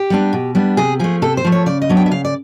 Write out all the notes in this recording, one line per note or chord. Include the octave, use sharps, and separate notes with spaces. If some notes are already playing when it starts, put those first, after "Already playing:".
Already playing: G4
G3 B3 D4
B2
G3 B3 D4
C3 G#4
F3 A3 G#4
C3 A4
C5
F3 A3
C#5
C#3 D5
D#5
F#3 B3 D4
G5
E5
C#3 F5
D5